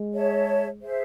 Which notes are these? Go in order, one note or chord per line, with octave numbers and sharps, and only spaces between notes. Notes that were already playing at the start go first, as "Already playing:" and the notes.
Already playing: G#3
G#4 C#5 E5 A5
G#4 C5 E5